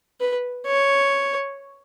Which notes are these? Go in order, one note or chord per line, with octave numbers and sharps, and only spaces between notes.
B4
C#5